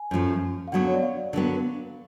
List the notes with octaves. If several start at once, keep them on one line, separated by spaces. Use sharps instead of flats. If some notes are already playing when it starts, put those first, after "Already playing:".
Already playing: G#5
F#2 F3 A3
F5
D3 F#3 B3 F#5
C#5
D5
F5
D3 F#3 B3